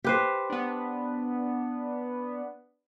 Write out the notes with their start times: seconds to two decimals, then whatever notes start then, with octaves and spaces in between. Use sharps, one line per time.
0.04 G4 B4 C5
0.50 B3 D4